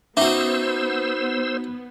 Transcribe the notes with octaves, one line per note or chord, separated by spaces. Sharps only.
B3 C#4 D#4 F#4 C5 E5 D6 E6